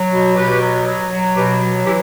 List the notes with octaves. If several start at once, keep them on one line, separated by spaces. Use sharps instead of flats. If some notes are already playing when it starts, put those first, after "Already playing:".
Already playing: F#3
B2
B2 G4 B4
F#3
F#3
F#3
B2 G4 B4
F#3
E3 E4 G4